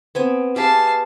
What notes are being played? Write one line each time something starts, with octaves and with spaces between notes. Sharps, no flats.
B3 C4 G#5
G4 G#4 B4 F5 A5